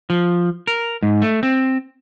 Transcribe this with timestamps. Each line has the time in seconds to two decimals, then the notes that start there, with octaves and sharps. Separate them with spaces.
0.10 F3
0.67 A#4
1.03 G#2
1.22 A3
1.43 C4